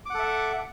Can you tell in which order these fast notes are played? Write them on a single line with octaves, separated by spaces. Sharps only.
D6 F#5 A4 E5